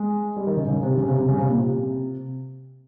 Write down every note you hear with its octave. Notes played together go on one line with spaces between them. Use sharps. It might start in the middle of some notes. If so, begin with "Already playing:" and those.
Already playing: G#3
G3
D#3
C#3
C#3
C3
C#3
C3
C3
C#3
C3
A#2
C3